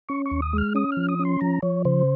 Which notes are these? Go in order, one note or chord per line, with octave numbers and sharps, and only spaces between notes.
C#4 C#6
C#6
D#2
D#6
G#3 F6
C#4 D#6
F3 F6
D#6
C#4
C6
F3 A#5
F3 C#5
C#3 C5